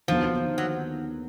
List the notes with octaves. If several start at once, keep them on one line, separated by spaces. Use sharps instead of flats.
D#2 D3 F3 F#3 B3
F#3